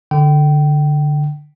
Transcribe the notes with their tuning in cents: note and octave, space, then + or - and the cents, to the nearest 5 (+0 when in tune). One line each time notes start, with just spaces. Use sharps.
D3 +0 G5 -25